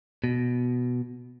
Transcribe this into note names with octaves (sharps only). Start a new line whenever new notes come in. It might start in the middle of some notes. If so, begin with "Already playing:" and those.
B2